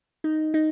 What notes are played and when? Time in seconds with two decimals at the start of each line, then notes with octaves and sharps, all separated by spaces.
0.24 D#4
0.54 D#4